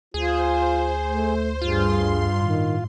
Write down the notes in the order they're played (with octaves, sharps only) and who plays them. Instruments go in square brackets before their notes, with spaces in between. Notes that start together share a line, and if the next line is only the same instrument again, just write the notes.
[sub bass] D2 [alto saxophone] F4 [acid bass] G#4 [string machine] C5
[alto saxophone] A3
[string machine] G2 C6 [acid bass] F4 [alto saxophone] G#4
[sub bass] A2 [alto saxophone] D#3